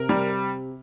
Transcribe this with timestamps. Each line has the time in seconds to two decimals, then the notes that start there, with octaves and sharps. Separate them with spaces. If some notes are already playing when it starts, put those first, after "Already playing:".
Already playing: C3 A#4
0.09 G3